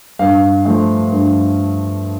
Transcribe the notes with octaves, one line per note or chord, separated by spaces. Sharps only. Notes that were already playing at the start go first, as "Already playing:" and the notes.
G2 F5
F3 A3
G2